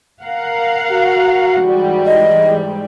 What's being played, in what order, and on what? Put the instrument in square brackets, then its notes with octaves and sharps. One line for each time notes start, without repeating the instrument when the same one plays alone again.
[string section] A#4 F5 F#5
[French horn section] F#4
[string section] G#2 E3 G3
[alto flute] D#5